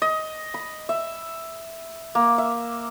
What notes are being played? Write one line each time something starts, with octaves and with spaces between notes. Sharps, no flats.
D#5
B5
E5
A#3
E5